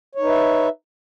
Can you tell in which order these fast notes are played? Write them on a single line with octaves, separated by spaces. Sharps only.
C#5 D#4 B4 E5